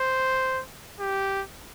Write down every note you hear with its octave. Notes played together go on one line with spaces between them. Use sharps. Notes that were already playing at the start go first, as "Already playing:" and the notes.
Already playing: C5
G4